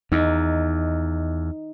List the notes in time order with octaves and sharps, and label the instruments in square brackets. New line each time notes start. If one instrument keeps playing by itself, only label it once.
[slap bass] E2 [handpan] D#4